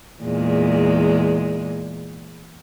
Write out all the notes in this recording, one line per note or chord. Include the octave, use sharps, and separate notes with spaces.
E2 A#2 G#3